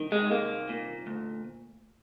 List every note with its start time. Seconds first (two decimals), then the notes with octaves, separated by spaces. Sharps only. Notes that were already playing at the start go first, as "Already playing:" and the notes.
Already playing: C2 D#3
0.12 G#3
0.31 C2 A#3
0.69 A#2
1.07 D2